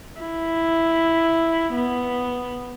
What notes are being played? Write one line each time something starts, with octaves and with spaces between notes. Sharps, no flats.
E4
B3